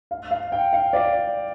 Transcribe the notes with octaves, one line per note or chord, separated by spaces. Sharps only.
F5
F5
G5
F5
D5